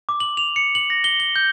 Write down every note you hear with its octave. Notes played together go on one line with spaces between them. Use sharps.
D6
F#7
F7
C#7
F#7
A#6
G7
G7
G6